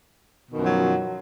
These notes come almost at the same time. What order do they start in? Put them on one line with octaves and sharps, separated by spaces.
B2 D#3 F#2 F3 F#3